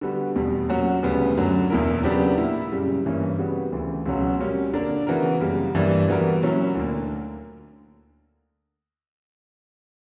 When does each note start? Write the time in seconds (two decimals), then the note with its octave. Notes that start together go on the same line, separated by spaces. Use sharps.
0.01 D3 G3 B3 F#4
0.36 E2 B2 G3
0.69 A#2 F#3 C#4 F#4
1.03 D2 C#3 G3 B3
1.37 F#2 D3 F#3
1.70 E2 B2 A#3 E4 A#4
2.03 C#3 F#3 B3 D4 G4
2.38 A#2 A#3 E4
2.72 F#2 C#3 G3
3.06 G2 E3 A#3 C#4
3.38 C#3 G3 B3 F#4
3.72 D2 C#3 E3
4.06 C#2 B2 F#3 C#4 F#4
4.39 A#2 G3 A#3 C#4 F#4
4.74 D3 A#3 D4 A#4
5.07 C#3 E3 B3 F#4 A#4
5.40 F#2 C#3 G3 A#3
5.75 G2 E3 G3 A#3 D4
6.08 E3 G3 B3 F#4 A#4
6.42 A#2 F#3 C#4 E4
6.75 D2 D3 A#3